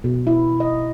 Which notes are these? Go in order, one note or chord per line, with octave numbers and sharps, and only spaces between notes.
B2
E4
D#5